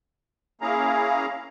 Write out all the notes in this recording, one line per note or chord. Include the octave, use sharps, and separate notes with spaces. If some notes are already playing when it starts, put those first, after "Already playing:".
A#3 C#4 E4 G#4 F5 A#5